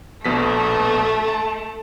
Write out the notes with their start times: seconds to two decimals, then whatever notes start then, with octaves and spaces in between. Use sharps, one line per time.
0.25 A#1 B2 A3 B6
1.28 A5